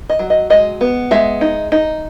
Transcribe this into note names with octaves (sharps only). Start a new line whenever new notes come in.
D#5
F#3
D#5
G#3 D#5
B3
G#3 E5
D#4
D#4